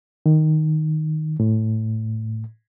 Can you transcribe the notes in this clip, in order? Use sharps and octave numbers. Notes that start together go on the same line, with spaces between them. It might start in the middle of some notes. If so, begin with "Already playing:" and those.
D#3
A2